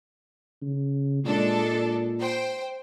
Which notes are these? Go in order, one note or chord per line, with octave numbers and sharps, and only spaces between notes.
C#3
A#2 G#3 D4 A4
C5 G5